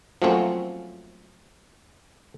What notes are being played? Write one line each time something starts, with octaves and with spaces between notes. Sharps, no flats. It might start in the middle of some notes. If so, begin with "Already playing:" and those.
F3 F#3 A3 A#3 C4 C#4